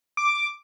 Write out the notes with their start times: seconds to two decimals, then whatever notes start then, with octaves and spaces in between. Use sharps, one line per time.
0.17 D6